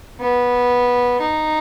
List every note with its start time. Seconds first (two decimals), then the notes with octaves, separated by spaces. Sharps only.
0.20 B3
1.21 D#4